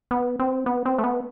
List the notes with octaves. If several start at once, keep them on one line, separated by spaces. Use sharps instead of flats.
B3
C4
B3
C4
A3
B3